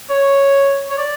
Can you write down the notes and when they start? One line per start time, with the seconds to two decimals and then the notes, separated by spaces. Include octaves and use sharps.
0.09 C#5
0.90 C#5
0.98 D5